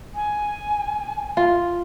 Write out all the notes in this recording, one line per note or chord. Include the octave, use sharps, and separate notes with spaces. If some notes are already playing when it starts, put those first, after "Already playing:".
G#5
F4